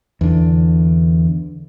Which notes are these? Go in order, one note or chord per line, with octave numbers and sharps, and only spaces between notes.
E2 D3